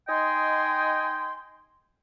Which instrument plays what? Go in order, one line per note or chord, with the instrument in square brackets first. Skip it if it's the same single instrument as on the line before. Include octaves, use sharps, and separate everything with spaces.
[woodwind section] D#4 D#5 G5 G#5 C6